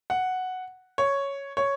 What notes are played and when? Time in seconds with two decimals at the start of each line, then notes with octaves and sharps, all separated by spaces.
0.10 F#5
0.98 C#5
1.57 C#5